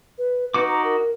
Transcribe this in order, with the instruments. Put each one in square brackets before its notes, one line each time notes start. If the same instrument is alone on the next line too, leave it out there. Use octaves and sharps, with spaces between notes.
[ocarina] B4
[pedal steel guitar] D#4 F#4 D6 [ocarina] B4
[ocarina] A#5
A#4